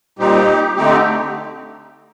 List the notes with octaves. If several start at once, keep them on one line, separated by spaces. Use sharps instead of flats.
A#2 G3 C4 D#4 G4
D3 A3 C4 D#4 G4